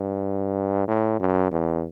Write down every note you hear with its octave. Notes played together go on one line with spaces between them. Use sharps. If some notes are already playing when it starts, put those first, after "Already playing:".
Already playing: G2
A2
F#2
E2